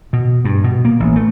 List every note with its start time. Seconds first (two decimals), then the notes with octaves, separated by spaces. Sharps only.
0.13 B2
0.45 G2
0.64 B2
0.85 A#3
1.00 A1
1.16 A3